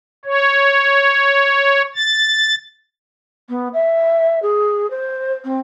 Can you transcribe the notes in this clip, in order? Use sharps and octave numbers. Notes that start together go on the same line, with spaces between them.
C#5
A6
B3
E5
G#4
C5
C4